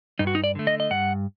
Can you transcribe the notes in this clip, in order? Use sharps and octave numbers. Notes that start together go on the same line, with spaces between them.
G2 D#4
F#4
D#4
D5
D3 A3
D#5
D#5
G2 F#5